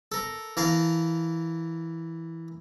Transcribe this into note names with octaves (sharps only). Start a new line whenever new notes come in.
A4 A#4
E3 A#4 F5 A5